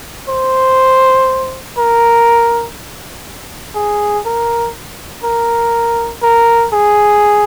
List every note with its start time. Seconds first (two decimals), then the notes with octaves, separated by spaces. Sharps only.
0.29 C5
1.78 A#4
3.75 G#4
4.25 A#4
5.24 A#4
6.23 A#4
6.73 G#4